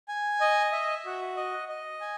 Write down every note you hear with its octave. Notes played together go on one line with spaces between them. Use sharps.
G#5
D#5
E5
F#4
D#5
D#5
G#5